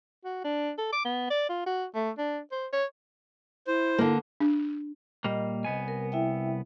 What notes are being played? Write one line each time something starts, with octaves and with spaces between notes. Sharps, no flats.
F#4
D4
A4
D6
B3
D5
F4
F#4
A3
D4
C5
C#5
E4 C5
D3 A#3
D4
A#2 G3 A#3 D#5
C2 B3 G#5
A#4
E4 E5 G5